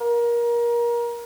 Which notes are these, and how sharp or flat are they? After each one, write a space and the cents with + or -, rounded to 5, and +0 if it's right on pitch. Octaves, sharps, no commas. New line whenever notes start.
A#4 +25